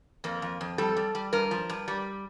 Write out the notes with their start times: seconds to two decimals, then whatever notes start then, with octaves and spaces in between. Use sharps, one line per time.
0.24 F2 A#3
0.42 F2
0.61 F2
0.78 G3 A4
0.96 G3
1.15 G3
1.33 G2 A#4
1.51 F3
1.70 G2
1.88 G3